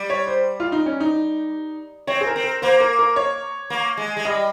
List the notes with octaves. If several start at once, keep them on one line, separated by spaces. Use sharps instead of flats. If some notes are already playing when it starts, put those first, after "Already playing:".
Already playing: G3
C#5
C5
F4
D#4
C#4
D#4
C4 C#5
G#4
A#4
C4
A#4
A#3 C5
A#4
A#4
C#5
A#3
G#3
G#3
G3 D#5